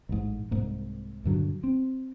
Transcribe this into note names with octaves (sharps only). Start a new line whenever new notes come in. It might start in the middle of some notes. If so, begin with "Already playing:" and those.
A1 G#2
C2 G#2 A#3
D#1 G2 D3 F#3
C4